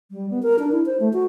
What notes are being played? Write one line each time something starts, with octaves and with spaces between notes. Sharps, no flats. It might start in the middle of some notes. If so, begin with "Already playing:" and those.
G3
B3
A#4
D4
E4
C5
A3
F#4